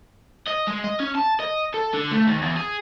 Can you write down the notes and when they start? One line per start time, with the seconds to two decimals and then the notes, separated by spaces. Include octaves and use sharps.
0.48 D#5
0.68 G#3
0.84 D#5
1.00 C#4
1.15 A5
1.40 D#5
1.74 A4
1.94 D3
2.12 A3
2.27 D#2
2.42 E2
2.56 G#4